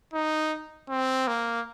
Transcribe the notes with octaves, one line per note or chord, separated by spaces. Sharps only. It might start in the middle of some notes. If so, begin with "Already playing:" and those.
D#4
C4
A#3